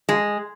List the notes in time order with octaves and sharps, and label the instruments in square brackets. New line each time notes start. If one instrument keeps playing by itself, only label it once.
[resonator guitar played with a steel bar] G#3